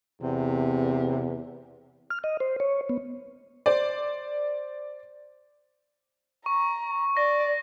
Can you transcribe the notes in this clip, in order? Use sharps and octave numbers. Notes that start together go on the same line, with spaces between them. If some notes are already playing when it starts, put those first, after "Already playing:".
E2 C3
F6
D#5
C5
C#5
B3
C5 D5
A#5 C#6
D5 A#6